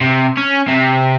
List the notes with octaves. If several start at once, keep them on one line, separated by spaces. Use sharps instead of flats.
C3
C#4
C3